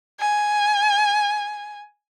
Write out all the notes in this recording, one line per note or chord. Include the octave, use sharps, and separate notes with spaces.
G#5